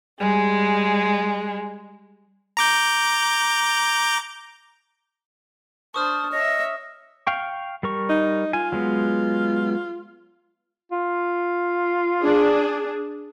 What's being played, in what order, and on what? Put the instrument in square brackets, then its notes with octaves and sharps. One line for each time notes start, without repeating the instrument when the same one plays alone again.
[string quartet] G3 G#3 G#4
[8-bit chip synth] A#5 D6 G6
[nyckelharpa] D4 C5 [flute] A5 [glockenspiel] C#6 D#6 F6
[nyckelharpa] C#5 E5 [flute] D#5
[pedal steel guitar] F5 G5 C#6
G3 A#4 C#6
[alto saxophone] D#4
[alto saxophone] F4 [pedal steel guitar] G#5
[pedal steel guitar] F#3 G#3 B3
[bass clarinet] F4
[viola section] D4 G#4